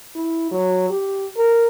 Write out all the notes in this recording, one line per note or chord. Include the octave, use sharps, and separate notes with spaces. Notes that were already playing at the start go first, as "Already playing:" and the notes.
E4
F#3
G4
A#4